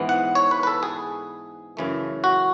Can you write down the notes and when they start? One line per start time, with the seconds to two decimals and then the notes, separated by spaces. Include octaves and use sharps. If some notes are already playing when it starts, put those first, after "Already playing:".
Already playing: G#2 E3 B3
0.09 F#5
0.35 C#5
0.51 B4
0.63 B4
0.67 A4
0.83 G#4
1.77 F#2 C#3 E3 A3
2.24 F#4